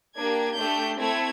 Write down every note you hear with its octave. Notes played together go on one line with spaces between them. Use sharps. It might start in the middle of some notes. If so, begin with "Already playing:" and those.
A#3 D4 G4 G#6
A3 D4 G4 G6
A3 C4 E4 A4 G#6